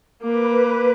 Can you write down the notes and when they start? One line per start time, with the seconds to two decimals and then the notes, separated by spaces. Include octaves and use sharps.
0.22 A#3 B4 D6